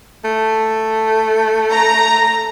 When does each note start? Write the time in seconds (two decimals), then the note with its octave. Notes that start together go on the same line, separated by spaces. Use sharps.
0.24 A3
1.71 A#5